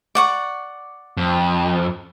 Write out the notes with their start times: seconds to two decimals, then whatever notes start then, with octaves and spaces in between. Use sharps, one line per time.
0.15 D5 F#5 C#6
1.17 F2